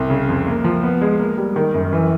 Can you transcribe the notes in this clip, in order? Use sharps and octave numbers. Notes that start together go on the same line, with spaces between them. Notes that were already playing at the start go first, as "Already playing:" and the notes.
Already playing: C2
C#3
F2
A#3
F3
B3
G#3
A#3
G3
D#3
F#2
E3